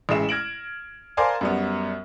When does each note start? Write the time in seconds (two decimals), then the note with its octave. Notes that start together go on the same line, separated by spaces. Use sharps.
0.09 A1 C#3 G#3 E5 E7
0.29 F6 G#6 A#6 D7 F#7
1.17 A#4 C5 D5 F5 G#5 A5
1.41 F#2 G3 B3